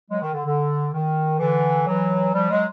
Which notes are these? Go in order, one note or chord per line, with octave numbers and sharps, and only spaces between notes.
F#3 G#3
D#3
D3
D3
D#3
D3 E3
E3 F#3
F3 G3
F#3 G#3